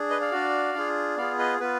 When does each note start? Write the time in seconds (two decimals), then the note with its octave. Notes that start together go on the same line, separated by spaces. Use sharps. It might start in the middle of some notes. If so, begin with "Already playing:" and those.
Already playing: D4 G#4
0.10 B4 D#5
0.21 D5 F5
0.32 D4 F#4
0.75 D4 F4 G#4
1.17 B3 F4 G#4 D5 F5
1.39 B4 D#5
1.60 B3 F4 B4